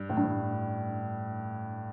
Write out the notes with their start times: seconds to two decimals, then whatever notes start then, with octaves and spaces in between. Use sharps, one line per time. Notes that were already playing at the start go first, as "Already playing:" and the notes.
Already playing: G2
0.10 A2
0.17 G2
0.24 A2